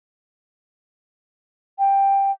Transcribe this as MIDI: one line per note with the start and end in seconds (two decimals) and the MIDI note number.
1.79 2.31 79